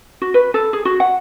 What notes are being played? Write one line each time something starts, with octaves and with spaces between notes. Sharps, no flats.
F#4
B4
A4
G#4
F#4
F#5